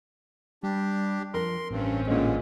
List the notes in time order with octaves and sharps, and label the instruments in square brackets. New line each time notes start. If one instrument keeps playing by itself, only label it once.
[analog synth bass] G3 [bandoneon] D4 G4
[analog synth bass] F2 [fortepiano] A#4 [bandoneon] C6
[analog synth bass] A1 [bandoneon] G2 [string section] C4 C#4
[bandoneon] G2 D3 [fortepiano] A#2 G#3